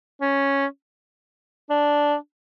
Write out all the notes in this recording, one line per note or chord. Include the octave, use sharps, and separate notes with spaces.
C#4
D4